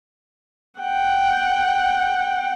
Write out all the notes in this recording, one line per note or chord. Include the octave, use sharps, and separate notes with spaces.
F#5 G5